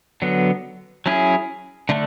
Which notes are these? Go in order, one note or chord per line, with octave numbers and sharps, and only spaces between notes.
D3 F#3 B3
F#3 C#4 E4 G#4
D3 A3 D4